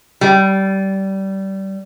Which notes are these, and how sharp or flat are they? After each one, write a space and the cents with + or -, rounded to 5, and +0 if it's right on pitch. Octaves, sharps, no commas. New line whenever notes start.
G3 -20